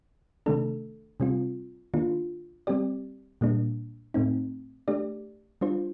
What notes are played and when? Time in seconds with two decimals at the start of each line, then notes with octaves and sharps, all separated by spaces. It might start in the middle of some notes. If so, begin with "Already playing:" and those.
0.46 C3 D#3 A3 D4 A4
1.20 C3 G3 C4 F4
1.94 D#3 A#3 D4 F4
2.67 G3 C4 G4 D5
3.41 A#2 G3 A#3 D4
4.14 A2 A3 C4 D#4
4.88 A3 D4 G4 D5
5.61 G3 D4 F4 C5